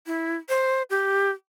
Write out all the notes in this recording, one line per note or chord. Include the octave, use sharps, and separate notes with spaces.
E4
C5
G4